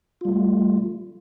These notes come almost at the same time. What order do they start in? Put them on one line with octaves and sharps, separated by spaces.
F4 G3 A3